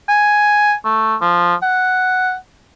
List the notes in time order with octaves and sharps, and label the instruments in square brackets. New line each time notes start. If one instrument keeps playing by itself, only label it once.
[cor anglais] G#5
A3
F3
F#5